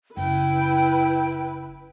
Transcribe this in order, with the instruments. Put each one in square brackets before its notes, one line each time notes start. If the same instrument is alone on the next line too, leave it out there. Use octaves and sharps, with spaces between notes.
[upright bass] F#1 [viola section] E4 B4 [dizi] G5